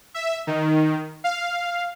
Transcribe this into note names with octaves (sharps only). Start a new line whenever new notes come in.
E5
D#3
F5